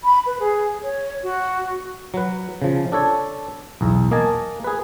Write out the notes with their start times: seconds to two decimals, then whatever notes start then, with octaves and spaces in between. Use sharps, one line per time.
0.04 B5
0.26 B4
0.40 G#4
0.82 C#5
1.23 F#4
2.14 F#3 B4
2.62 C#3 F3
2.92 D4 A4 C#5
3.81 B1 E2
4.11 A#3 D#5 G#5 A5
4.64 G#4 B4